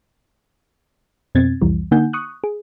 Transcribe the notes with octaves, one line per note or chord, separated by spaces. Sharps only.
F2 B2 C4 G#6 A6
C2 F2 E3 G3
D3 A#3 D#4 F#5 G#5 G6
C#6 D#6 F#6
G#4